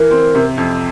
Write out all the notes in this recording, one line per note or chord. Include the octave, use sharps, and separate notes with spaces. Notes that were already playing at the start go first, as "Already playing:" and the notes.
Already playing: E3 A#4
C4
C3
F2